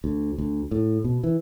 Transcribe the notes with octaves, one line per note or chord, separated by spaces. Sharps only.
D2
D2
A2
B2
E3